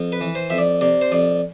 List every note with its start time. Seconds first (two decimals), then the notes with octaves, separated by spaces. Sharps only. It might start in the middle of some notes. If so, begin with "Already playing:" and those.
Already playing: F2
0.12 B4
0.21 E3
0.35 C5
0.50 F2 E5
0.58 D5
0.81 C3 D5
1.01 C5
1.12 F2 D5